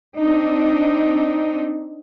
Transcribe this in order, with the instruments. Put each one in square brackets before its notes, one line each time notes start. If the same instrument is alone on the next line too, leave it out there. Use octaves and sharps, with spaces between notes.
[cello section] C4 D4 D#4